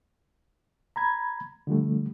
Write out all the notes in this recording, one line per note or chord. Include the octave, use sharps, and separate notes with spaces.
A#5 B5 G#6
D3 F3 G3 A3